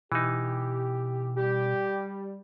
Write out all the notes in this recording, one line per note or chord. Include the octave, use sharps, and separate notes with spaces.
B2 E3 D#4 G4
G3 G4